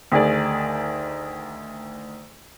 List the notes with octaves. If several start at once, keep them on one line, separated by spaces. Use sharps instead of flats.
D2 D#3 G#4 D5